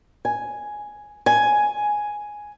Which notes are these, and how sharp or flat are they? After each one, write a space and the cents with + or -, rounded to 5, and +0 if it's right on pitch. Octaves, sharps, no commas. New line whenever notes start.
G#5 +5
G#5 +5